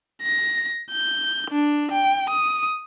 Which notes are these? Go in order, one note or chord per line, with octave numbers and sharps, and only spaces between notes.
A#6
G6
D4
G5
D#6